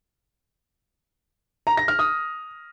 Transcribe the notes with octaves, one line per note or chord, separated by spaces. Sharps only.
A#5
A#6
F6
D#6